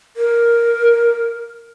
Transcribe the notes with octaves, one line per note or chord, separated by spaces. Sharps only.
A#4